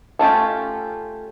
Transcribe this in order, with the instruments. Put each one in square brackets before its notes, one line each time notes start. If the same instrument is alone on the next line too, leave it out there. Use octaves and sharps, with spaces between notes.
[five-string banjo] A3 C#4 F4 G4